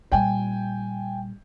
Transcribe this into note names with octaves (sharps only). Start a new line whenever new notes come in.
A#2 G3 G5 G#5